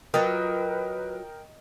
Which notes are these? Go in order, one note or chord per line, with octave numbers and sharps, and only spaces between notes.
F#3 F4 A#4 B4 D#5 G5 D#6